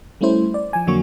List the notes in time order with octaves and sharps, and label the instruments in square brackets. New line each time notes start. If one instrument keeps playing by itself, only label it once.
[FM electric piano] G3 A3 C#4 E4 C5
D5
F3 G#5
F2 D3 F#3 A#3 F#4 C#6